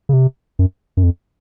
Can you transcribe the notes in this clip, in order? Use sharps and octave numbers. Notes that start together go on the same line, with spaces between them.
C#3
C3
F#2
F#2
F2